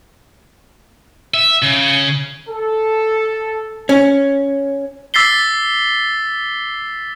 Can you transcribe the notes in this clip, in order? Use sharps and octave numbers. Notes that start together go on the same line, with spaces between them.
E5
C#3
A4
C#4
D6 E6 A6 B6 C7 G7